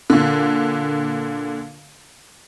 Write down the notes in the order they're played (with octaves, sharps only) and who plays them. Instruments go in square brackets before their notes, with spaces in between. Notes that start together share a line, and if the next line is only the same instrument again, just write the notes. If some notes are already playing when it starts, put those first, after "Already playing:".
[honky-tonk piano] A#2 D3